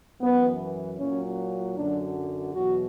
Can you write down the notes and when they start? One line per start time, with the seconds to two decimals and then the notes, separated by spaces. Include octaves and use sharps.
0.21 F#2 E3 B3
0.98 A#2 F#3 C#4
1.76 F#2 D3 F#3 D4
2.53 E2 B2 F#3 F#4